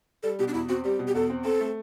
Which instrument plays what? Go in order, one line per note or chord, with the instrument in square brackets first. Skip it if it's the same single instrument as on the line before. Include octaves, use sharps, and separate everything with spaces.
[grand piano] G3 [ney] A4
[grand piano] B2 [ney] G4
[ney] D4
[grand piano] E2 [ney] E4
[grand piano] C4 [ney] F#4
[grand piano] G3 [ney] G4
[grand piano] B2
[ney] G4
[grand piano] E2 [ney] A4
[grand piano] C4
[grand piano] C4 [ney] A4
[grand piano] A3